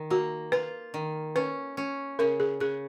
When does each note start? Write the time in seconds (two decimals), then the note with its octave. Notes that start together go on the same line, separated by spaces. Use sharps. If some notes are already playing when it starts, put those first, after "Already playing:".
Already playing: D#3
0.10 A#3 F#4
0.52 F4 B4
0.94 D#3
1.36 C#4 B4
1.77 C#4
2.19 C#3 A#4
2.40 G#4
2.60 C#3 G#4